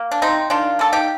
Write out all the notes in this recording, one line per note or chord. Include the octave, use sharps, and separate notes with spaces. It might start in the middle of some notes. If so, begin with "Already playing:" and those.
Already playing: A#3
D4
C3 C4 D#4
D#3 D4 F4
A#3 A4
D#4 G4